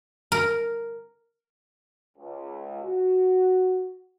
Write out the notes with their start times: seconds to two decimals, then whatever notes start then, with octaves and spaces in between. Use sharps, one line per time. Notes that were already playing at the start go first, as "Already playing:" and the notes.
0.32 A#4
2.18 C#2
2.83 F#4